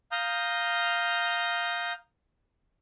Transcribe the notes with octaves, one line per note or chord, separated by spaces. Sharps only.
F5 A#5 D#6 G6